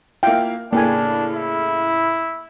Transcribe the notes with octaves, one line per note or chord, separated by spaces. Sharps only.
A#3 E4 F4 G5
A2 C#3 A#3 D4 G5 G#5
E4